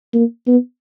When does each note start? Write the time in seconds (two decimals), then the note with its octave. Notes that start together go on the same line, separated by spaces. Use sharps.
0.14 A#3
0.47 B3